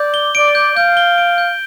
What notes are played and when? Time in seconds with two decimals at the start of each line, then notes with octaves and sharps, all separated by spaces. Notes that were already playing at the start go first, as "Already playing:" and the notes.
Already playing: D5 G6
0.14 G7
0.35 D5 D7
0.55 G6
0.76 F5 G6
0.97 G7
1.18 D7
1.38 G6